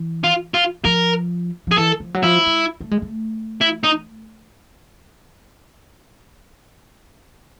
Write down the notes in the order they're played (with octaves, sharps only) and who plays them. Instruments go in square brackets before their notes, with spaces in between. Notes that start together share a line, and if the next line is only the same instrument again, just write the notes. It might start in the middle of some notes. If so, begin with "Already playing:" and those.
Already playing: [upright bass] E3
[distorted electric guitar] F4
F4
[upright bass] F3 [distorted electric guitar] A#4
[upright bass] F3 [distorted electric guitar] G#4
[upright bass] E3 [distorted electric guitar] A4
[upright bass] F3
F#3
[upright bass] F3 [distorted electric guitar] E4
[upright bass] G#3
A3
G#3
A3
[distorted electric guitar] E4
D#4